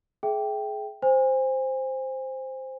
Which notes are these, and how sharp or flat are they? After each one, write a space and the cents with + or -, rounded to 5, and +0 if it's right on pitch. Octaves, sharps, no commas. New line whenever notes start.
G#4 +30 E5 +0 G5 +0
C5 +0 G#5 -35